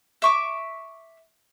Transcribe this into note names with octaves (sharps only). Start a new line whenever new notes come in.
E5 C#6 D6